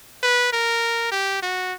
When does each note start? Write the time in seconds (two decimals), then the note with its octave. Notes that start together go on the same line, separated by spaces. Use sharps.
0.23 B4
0.53 A#4
1.12 G4
1.42 F#4